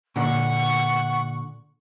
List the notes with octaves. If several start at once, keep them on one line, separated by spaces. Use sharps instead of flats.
A#2 D3 F#5 C#6